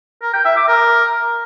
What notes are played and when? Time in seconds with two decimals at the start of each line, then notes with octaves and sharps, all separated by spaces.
0.22 A#4
0.34 G5
0.45 E5
0.56 D6
0.68 A#4